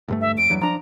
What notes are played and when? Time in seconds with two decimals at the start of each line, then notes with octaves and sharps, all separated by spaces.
0.08 D2 G2 A3
0.21 E5
0.38 F2 D7
0.49 E2 G2 F#3
0.61 F3 D4 A#5